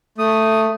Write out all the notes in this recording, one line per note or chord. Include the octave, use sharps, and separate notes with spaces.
A3 D#6